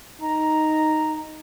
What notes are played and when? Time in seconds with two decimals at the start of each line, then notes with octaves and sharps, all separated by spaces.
0.21 D#4 A#5